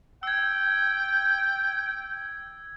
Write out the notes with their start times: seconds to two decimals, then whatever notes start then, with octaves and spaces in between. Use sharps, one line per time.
0.23 G5 E6 G#6